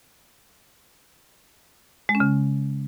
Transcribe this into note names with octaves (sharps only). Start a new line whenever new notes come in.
G#3
C#4
C#3